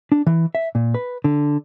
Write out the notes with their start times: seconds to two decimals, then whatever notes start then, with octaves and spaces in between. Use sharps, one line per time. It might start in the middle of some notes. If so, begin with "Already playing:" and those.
0.12 D4
0.27 E3
0.55 E5
0.75 A#2
0.94 B4
1.24 D3